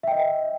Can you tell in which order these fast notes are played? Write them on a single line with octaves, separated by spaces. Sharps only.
E5 G5 D#5